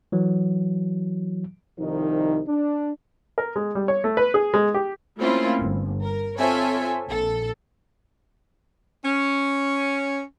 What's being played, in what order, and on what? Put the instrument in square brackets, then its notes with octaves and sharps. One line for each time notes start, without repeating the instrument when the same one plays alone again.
[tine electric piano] E3 F#3
[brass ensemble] C2 D#3 F3 D#4
D4
[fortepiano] A#4
G#3
G3
C#5
A3
B4
G#4
G#3
G4
[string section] A3 A#3 C4 C#4 E4 F4
G1
A#4
C4 F4 A4 C#5 E5 G#5
A#1 A4
[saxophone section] C#4